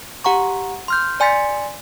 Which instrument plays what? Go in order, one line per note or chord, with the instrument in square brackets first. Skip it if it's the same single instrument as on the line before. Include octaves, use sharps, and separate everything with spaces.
[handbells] G4 F#5 A#5 C#6
C6 F6 G6
D5 G#5 C6 A6 B6 C#7